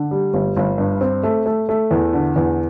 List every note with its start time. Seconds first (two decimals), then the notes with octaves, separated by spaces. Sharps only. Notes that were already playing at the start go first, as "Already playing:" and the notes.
Already playing: D3
0.11 G3
0.33 G1
0.56 G1
0.78 G2
1.01 C4
1.23 A3
1.46 A3
1.69 A3
1.91 E2
2.13 D3
2.36 E2